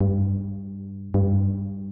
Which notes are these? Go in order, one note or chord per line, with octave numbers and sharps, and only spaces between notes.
G2
G2